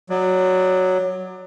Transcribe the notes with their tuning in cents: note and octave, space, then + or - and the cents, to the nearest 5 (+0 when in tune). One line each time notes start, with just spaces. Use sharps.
F#3 +0 D5 +25